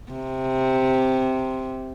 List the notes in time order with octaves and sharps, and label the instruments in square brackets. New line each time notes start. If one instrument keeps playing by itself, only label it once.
[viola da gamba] C3